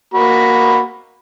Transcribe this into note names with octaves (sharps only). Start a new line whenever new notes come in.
A#3 F#4 B5